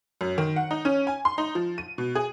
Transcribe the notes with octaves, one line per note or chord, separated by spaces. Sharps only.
F#2
D#3
F#5
D#4
C#4
G#5
C6
D#4
F3
D#7
B2
G#4